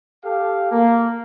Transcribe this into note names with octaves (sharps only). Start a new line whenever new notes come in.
G4 A4 F5
A#3